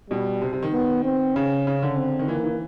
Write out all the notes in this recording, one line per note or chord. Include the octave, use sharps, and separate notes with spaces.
B2 G3
C3
C3
D#3
B3
C4
C#3 C#4
C#3
D3
C4
D#3
E3 A#3
E3